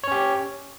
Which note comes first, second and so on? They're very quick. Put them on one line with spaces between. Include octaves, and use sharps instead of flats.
C#5 C#4 G4